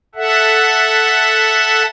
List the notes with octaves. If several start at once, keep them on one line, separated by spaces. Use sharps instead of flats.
A4 E5 F#5